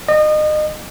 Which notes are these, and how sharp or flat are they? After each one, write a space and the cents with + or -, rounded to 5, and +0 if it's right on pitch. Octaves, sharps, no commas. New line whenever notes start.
D#5 -30